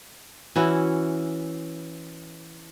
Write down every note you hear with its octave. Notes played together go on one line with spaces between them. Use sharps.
E3 C#4 E4 F#4